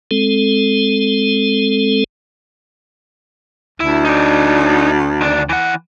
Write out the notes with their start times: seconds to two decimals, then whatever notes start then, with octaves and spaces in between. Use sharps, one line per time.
0.11 G#3 C4 A4
3.80 D2 E4
4.05 D#4 D5
5.21 D#3 D4
5.49 E3 F#5